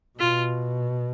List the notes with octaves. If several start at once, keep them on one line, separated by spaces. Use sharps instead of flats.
B2 F4